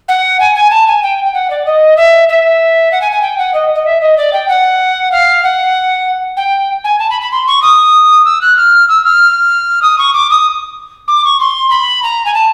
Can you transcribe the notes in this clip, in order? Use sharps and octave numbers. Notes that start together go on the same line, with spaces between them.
F#5
G#5
G#5
A5
G#5
G5
G5
F#5
D5
D#5
E5
E5
F#5
G#5
G#5
G5
F#5
D#5
D#5
E5
D#5
D5
G5
F#5
F5
F#5
G5
G#5
A5
B5
B5
C6
C#6
D#6
E6
F#6
F6
E6
F6
D#6
C#6
D6
D#6
D6
C#6
C6
B5
A#5
G#5
A5